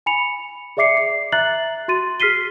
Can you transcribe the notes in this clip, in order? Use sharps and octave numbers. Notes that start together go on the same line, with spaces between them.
G#5 B5 C#7 F7
G#4 D5 E5 D6 C7 C#7
C7
E5 A#5 F#6 A6 F#7
F#4 C6 A6 D#7
G#4 F6 B6 C7 D#7 G7